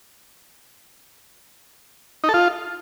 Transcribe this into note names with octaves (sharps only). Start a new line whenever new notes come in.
D#4
A4
F4